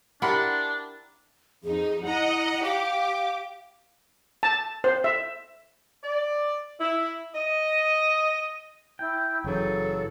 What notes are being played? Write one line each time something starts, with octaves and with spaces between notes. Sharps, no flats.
D4 E4 G4 A#4 F#5 B5 C6
F2 D#4 G#4
E4 D#5 F#5 A#5
G4 F5 D6
A5
C5
E5
D5
E4
D#5
E4 G5
F#1 C#3 E3 F#3 A4